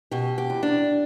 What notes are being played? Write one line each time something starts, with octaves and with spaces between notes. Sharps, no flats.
B2 G4
G4
E2
D4